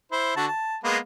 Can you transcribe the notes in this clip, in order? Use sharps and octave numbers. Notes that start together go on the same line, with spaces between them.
E4 C5
D3 F#4 A5
A5
G#3 A#3 B3